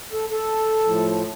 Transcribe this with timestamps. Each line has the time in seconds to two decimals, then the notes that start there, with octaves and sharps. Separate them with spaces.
0.12 A4
0.30 A4
0.84 A2 F3